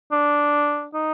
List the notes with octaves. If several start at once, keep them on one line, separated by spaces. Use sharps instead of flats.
D4
D#4